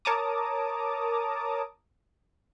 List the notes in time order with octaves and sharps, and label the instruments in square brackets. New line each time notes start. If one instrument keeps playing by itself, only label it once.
[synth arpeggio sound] A#4 C#5 A5 A#5 D6 D#6